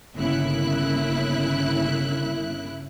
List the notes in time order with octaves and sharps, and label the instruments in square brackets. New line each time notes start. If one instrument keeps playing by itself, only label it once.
[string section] G1 C#3 A#3 E4 E5 F#6